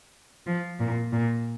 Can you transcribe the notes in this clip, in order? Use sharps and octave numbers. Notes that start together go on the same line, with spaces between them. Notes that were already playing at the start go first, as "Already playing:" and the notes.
F3
A#2
A#2